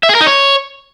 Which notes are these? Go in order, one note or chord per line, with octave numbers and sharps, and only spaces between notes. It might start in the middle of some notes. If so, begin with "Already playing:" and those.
E5
G#4
A#4
D#4
C#5